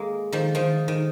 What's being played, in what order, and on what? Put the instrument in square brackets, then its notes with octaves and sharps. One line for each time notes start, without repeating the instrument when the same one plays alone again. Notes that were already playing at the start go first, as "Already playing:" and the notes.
Already playing: [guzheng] G#3 A#3
D#3 F3
D#3 F3
D#3